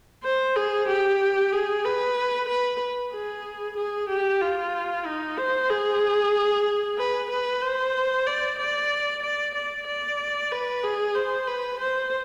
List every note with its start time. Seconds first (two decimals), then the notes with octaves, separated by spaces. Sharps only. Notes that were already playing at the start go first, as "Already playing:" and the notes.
0.24 C5
0.56 G#4
0.88 G4
1.52 G#4
1.85 B4
2.48 B4
3.13 G#4
3.77 G#4
4.09 G4
4.41 F4
5.06 D#4
5.37 C5
5.70 G#4
6.98 B4
7.30 B4
7.62 C5
8.26 D5
8.59 D5
9.23 D5
9.54 D5
9.87 D5
10.52 B4
10.84 G#4
11.15 C5
11.47 B4
11.80 C5